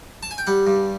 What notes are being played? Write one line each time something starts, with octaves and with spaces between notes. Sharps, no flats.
A5
G#5
G5
G3 F#5
G2